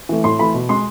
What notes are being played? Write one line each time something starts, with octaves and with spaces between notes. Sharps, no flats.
E3 A3
A2 C6
E3 A3 B5
B2
G#3 C6